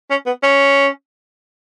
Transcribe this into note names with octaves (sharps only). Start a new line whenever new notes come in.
C#4
B3
C#4